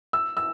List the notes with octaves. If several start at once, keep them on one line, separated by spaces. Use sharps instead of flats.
E6
E6